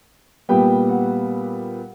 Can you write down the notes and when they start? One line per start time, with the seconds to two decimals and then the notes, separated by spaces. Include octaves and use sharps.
0.49 A#2 G3 B3 G5
0.89 F#5